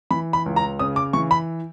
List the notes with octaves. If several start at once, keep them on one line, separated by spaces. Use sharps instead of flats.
E3 B5
B5
C#2
A#5
C#3 D#6
D6
E3 C#6
B5